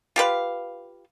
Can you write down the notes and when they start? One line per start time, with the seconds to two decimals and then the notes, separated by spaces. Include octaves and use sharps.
0.16 F4 G4 B4 F5